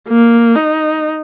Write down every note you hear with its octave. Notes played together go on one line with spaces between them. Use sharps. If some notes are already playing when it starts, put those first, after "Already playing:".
A#3
D#4